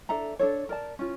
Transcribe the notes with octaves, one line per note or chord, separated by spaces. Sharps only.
D4 A4 E5 A#5
D4 A4 C#5
A#4 D5 A5
C#4 F4